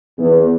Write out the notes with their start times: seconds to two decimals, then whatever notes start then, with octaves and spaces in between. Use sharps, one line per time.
0.19 E2